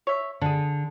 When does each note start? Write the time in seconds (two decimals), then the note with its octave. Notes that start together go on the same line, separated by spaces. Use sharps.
0.07 C#5 E5
0.41 D3 D4 G#4